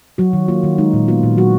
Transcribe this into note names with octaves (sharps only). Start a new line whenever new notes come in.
F#3 F#4
D#3
A#3 F4
D#3
G#3 D#4
A#2
B3 F4
A#2
F#3 F#4